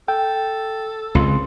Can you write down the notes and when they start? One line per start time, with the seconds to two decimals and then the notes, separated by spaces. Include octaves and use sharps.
0.08 A4 G5
1.15 C#2 C4 F4 C6